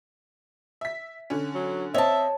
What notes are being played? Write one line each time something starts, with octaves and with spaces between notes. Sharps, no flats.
E5 B6
D3 C#4
F#3
C4 C#5 D#5 E5 A5